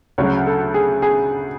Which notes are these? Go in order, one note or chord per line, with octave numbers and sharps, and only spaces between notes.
D2 C#3 F#3 C#5
A4
G#4
G#4